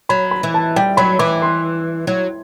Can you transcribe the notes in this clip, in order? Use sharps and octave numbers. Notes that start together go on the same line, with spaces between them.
F#3 B5
B5
E3
A5
G3 G5
F#3 B5
E3 D6
C6
F#3